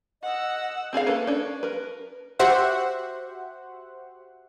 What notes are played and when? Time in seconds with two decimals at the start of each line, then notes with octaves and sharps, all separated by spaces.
0.23 D#5 F#5 E6
0.93 C4 G#4 A4 F5
1.07 A#3 C#4 A4 B4
1.27 C#4 D4
1.63 A#4 B4
2.39 F#4 G4 C5 E5 F#5